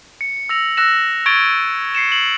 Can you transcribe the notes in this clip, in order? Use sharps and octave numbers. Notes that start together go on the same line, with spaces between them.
C#7
E6 A#6 F7
E6 F#6 A#6 E7
C#6 G#6 A6 D7 F7 G7
C7 C#7 E7
F#7